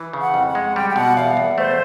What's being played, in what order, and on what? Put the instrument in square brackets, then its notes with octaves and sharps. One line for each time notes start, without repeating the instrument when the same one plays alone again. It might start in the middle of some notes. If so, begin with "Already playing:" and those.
Already playing: [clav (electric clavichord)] E3
C#3
[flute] F#5
[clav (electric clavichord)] F2
[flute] F#5
[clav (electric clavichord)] G#3
[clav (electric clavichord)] G3 [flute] G5
[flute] G5
[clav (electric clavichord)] B2 [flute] F#5
[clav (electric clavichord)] E2 [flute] F5
[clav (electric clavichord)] E2
[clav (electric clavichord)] A3 [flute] C5